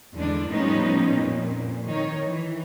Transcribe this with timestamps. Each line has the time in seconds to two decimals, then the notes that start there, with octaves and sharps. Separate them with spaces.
0.14 E2 D3 G#3 D4
0.51 A2 F3 G3 B3 C#4 D#4
1.14 F2 A#2
1.87 D#3 D#4 C#5
2.25 E3